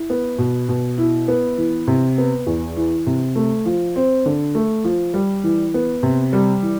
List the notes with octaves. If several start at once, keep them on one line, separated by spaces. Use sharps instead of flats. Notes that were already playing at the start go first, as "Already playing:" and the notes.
Already playing: E4
B3
B2
B2
E4
B3
E3
C3
B3
E2
E3
C3
A3
F3
C4
D3
A3
F3
G3
E3
B3
C3
G3
E3